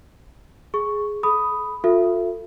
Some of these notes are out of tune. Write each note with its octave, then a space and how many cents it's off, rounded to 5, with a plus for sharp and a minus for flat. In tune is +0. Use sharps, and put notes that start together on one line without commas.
G#4 +0 C#6 +0
A4 -45 B5 +0 D#6 +0
F4 +40 A4 +25 E5 +25